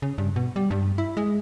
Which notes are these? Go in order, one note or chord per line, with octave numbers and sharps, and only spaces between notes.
C#3
G2
B2
G3
G2
E4
G#3